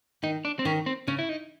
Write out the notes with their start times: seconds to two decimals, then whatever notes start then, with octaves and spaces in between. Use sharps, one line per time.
0.23 D#3 D#4
0.45 D4
0.59 C4
0.65 D#3 C#4
0.86 C4
1.07 C#3 C#4
1.19 E4
1.29 D#4